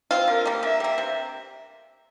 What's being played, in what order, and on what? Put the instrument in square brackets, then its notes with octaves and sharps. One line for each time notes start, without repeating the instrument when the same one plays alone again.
[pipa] C4 F4
[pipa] D3 [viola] A#4
[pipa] G3 A#3
[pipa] D3 [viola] E5
[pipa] G3 A#3
C3